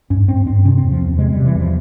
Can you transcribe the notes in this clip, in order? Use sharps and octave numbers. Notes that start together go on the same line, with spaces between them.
G2 C#4
G2 C4
G2 C4
C3 C#4
C4
E2
F3
E2
C3 G#3
G3
C3
E3
E2
F3